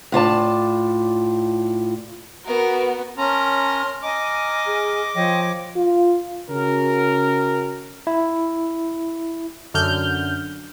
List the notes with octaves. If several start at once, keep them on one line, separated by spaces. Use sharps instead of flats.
A2 F4 D5 A5
B3 F#4 A#4
C#4 A#4 A5 A#5 C6 F6
D#5 G#5 A#5 D6 F6
G#4
F3 C#5 D#5 G5
F4
C#3 C#4 F#4 A#4
E4
F#2 D3 F6 G6